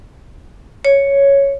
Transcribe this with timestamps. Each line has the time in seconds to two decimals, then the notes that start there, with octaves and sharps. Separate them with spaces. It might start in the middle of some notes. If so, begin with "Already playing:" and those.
0.85 C#5